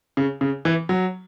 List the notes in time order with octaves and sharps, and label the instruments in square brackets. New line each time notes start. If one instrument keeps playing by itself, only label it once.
[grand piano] C#3
C#3
E3
F#3